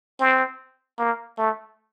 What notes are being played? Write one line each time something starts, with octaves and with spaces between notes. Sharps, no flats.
C4
A#3
A3